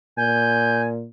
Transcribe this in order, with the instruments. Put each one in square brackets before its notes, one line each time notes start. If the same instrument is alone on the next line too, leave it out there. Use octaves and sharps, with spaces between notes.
[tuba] A#2 [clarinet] G#5 [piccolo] G6